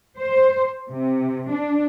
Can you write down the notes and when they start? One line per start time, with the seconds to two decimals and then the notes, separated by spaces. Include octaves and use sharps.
0.18 C5
0.90 C3
1.49 D4